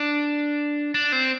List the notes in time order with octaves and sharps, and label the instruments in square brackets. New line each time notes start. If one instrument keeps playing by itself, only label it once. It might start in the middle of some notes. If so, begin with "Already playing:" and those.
Already playing: [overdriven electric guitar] D4
D4
C4